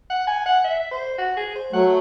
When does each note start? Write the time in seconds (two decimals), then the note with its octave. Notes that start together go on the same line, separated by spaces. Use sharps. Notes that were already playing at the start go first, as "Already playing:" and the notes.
0.10 F#5
0.27 G#5
0.46 F#5
0.64 E5
0.92 C5
1.18 F#4
1.37 G#4
1.55 C5
1.73 F#3 A3 F#5